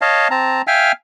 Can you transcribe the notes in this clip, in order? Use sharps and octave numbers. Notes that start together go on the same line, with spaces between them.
C#5 D#5 F5 A5
C4 A5 A#5
E5 F5 G5 G#5 F6